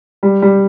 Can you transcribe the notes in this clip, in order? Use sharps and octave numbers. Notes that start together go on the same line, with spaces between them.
G3
G3